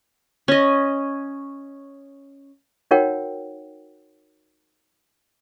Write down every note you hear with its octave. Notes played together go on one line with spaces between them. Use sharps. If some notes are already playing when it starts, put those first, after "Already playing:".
C#4 D#5
D#4 F#4 A#4 C#5 F#5 G5